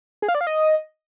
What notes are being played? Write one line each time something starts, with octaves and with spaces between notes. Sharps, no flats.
G#4
F5
D5
F5
D#5